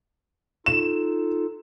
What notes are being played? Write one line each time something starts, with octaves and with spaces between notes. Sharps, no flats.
D#4 F4 A4 E7